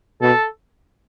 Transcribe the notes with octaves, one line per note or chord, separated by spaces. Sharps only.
B2 A4